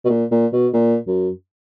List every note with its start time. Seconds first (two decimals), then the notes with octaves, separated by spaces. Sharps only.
0.05 B2
0.09 A#2
0.31 A#2
0.53 B2
0.73 A#2
1.07 F#2